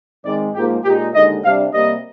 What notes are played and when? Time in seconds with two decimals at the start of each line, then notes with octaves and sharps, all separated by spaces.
0.25 G#2 D#3 G#3 C4 D#4 D5
0.55 G#2 F3 A#3 G4
0.84 A#2 G#3 D#4 G4
1.14 D#2 D3 G#3 D#4 D#5
1.44 C3 G3 D4 F5
1.73 C3 G3 A#3 D#5